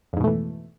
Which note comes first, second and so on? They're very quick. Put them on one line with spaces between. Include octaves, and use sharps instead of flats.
F2 G#2 B2 A3 E3